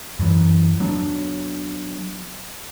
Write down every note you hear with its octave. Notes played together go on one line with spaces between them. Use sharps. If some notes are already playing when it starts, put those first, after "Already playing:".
F#2 E3
F#3 B3 D4